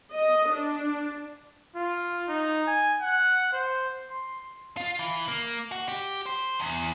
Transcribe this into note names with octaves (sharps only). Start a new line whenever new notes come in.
D#5
D4
F4
D#4
G#5
F#5
C5
C6
F4
E3
A#3
F#4
G4
C5
E2